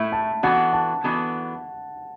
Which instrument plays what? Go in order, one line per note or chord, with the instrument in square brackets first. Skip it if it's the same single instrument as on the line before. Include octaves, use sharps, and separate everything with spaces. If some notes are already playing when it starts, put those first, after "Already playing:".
Already playing: [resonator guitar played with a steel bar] A2 A3 E4 [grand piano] E5 B5
[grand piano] A5
[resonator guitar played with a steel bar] E3 B3 D4 F#4 A4 [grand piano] F#5
[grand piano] A5
[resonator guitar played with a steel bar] E3 B3 D4 F#4 A4